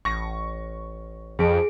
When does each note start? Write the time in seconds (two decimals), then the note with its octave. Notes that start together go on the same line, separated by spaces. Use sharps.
0.05 A1 C#6 A#6
1.39 F2 G#4 B6 D7